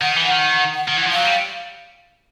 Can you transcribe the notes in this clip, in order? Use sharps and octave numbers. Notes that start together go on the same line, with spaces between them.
D#3 F#5
E3
D#3
F#5
F#5
D#3
E3
F3
F#3 F5
G3